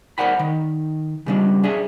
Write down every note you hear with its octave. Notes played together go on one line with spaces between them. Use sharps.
A#4 C5 D5 F#5 G5 B5
D#3
C#3 G3 D4
D4 G#4 E5